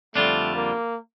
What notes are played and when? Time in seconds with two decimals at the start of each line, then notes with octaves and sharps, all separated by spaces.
0.15 F2 D3 G3 A3 D4 F4
0.55 A#3